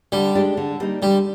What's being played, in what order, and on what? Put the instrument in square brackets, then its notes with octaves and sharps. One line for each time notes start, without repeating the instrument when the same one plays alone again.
[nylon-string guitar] D3 [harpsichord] G3
[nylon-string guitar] G#3 D4 G4
D3
G3 A#3 D#4
[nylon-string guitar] D3 [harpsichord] G3